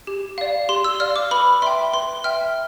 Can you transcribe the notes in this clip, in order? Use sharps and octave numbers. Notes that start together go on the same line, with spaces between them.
G4
D5 F5
G4 C6
E6
D5 F5 F6
D6
B4 B5
E5 G5 C6
B4 C6
E5 G5 F6